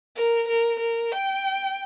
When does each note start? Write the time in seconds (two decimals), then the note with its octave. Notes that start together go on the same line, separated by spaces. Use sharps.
0.16 A#4
0.48 A#4
0.80 A#4
1.12 G5